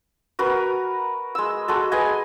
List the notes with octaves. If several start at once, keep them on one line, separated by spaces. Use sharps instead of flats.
F#4 A#4 B4
G#3 E6
G#3 F#4 A4
G#4 B4 D#5 G#5